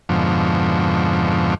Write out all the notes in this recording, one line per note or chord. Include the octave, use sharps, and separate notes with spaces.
F2 G#2 B2 D3 F3